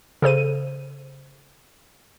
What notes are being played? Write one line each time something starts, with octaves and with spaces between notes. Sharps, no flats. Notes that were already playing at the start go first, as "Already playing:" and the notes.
C#3 A4 C5 D#7